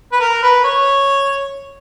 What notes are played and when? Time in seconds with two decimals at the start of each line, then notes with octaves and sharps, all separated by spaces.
0.12 B4
0.20 A#4
0.43 B4
0.64 C#5